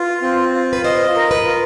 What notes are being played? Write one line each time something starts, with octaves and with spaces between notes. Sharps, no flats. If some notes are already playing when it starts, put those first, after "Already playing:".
Already playing: F4 B4
C4
F4
B4
C5 D#5
A#4
B4
F4